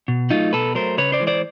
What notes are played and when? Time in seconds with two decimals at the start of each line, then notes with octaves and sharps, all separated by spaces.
0.08 B2
0.30 F#3 A3 D#4 F4
0.53 B2 A4 B4
0.75 F#3 A3 A#4 C5
0.98 C#3 B4 C#5
1.12 C5 D5
1.20 E3 G#3
1.27 C5 D5